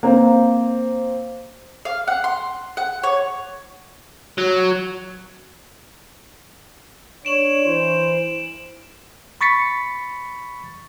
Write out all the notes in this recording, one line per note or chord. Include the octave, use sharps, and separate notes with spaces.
A#3 C4
F5
F#5
C6
F#5
C#5
F#3
D4 C#5 D7 E7 F#7
E3 C5
B5 C#6 A6 B6 C#7